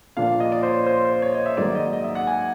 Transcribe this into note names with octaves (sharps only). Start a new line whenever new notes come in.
A#2 F3 A#3 D4 F5
D#5
D5
C5
C#5
C5
C5
C#5
D#5
E5
G#2 D#3 F#3 A#3 D5
D#5
D#5
E5
F#5
G#5